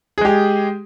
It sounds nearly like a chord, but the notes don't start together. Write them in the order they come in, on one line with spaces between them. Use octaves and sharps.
G#4 G#3 G4